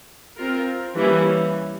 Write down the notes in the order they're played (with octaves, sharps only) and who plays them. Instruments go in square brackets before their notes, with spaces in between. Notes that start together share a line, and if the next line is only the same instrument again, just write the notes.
[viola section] C4 F4 A#4
E3 G3 A#3 C#4 E4